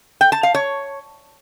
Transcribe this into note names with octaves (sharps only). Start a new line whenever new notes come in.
G5
A5
F5
C#5